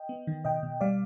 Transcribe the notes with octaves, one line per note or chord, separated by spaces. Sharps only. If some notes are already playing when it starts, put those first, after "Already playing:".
Already playing: D#5 G5
B3
D#3
B2 D#5 G5
B2
G3 D5 F5